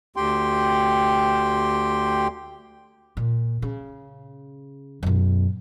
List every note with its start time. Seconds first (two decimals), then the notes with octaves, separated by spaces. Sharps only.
0.16 D2 G4 G5 C6
3.17 A#2
3.62 C#3
5.03 F#2 B2